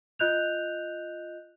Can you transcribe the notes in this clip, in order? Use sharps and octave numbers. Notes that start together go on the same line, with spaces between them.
F4 D#5 F#6 G6 F7